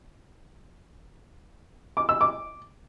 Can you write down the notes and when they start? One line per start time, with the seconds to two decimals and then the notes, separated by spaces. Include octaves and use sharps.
1.97 D6
2.09 E6
2.21 D6